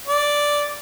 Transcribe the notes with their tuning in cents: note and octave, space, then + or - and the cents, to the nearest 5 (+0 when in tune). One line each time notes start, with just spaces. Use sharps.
D5 -5